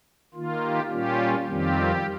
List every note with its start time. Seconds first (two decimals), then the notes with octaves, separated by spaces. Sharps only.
0.34 D#3 A#3 F4
0.63 G4
0.91 A#2 G3 C#4 F4 G4
1.47 F2 D#3 G3 C4 F4 G4